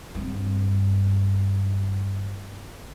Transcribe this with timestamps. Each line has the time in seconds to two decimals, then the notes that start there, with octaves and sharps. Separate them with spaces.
0.15 G2 C4